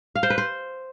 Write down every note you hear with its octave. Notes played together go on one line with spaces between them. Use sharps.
F5
C5
B4
C5